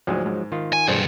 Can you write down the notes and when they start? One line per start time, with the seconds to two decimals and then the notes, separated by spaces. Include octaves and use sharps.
0.07 D2 G#2 F3 F#3 G#3
0.26 G#2
0.52 D#3 F4
0.73 G#5
0.88 B1 G2 D4 G#4 C5